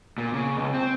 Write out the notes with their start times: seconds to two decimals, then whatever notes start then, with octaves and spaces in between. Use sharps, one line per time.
0.18 A#2
0.33 C#3
0.57 C#2
0.74 C4